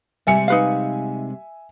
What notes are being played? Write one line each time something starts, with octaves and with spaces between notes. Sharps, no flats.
C3 G3 G#3 E5 G#5 C#7
D#4 B4 F5